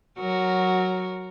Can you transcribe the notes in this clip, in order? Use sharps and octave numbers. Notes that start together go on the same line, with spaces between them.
F#3 F#4 A#4